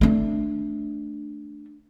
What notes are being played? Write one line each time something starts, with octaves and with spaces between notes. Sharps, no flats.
A3 D4